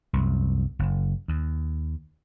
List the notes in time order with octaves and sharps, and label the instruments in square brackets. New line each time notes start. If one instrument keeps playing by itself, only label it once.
[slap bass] C2 F#2
F#1
D#2